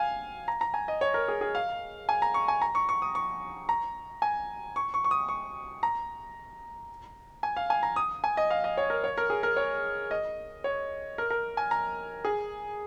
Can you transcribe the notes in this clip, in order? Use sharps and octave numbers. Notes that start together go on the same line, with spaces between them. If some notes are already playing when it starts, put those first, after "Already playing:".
Already playing: F5 G#5
A#5
A#5
G#5
D#5
C#5
A#4
G#4
G#4
F5
G#5
A#5
C#6
G#5
A#5
C#6
C#6
D#6
C#6
A#5
G#5
C#6
C#6
C#6
D#6
C#6
A#5
G#5
F5
G#5
A#5
D#6
G#5
D#5
F5
D#5
C#5
A#4
C#5
A#4
G#4
A#4
C#5
D#5
C#5
A#4
A#4
G#5
A#5
G#4